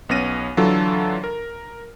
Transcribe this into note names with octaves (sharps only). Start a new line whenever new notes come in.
B1 B3 C#4 A#6 D#7
D3 E3 F#3 D4 F4 A4
A#4